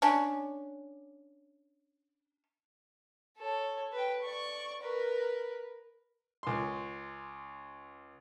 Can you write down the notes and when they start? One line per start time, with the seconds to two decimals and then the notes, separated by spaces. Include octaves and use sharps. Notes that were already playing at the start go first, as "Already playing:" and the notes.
0.02 C#4 D4
3.38 A4 C#5
3.92 B4 G5
4.22 D5 C#6
4.82 A#4 B4
6.43 C#2 C6